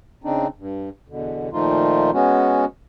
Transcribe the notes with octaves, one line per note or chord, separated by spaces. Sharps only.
C#3 C4 D4 D#4
G2
E2 B2 D3
A#2 D#3 F3 A3 D#4 F4
G#3 B3 C#4 F#4